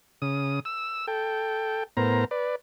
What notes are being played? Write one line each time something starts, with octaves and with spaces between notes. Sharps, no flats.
C#3 D#6
E6
A4 G5
A2 B3 A#4 C5 A#5
B4 D5